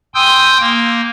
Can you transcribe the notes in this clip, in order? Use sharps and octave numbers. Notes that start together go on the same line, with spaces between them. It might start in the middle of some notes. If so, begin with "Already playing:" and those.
G5 G#5 C6 D#6 E6 G6
A#3